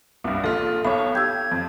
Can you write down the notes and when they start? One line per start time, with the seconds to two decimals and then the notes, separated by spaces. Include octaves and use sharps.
0.24 C2 G2
0.44 A#1 F4 A4
0.85 B1 C#5 B5
1.15 G4 E6 G6 G#6
1.51 F2